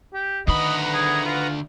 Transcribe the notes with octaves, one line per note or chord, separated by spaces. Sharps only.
G4
D2 D#3 D#4 B4 D#5 F#5 A#5 B5
G#4
F4